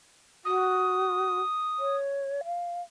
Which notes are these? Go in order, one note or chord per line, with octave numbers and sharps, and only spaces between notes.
F#4 D#6
C#5
F5